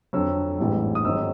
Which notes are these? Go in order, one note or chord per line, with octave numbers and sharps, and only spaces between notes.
F2 D3 F#3 E6
A1 G#2 E3 G3
D#6
G#1 G#2 D#3 F#3 E6